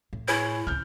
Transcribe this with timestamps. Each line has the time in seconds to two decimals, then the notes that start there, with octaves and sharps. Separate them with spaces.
0.13 A2
0.28 E4 G#4 C#5
0.67 D2 C#3 F6 G6